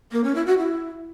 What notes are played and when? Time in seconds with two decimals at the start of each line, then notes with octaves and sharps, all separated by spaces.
0.12 A#3
0.24 C#4
0.35 E4
0.46 F#4
0.58 E4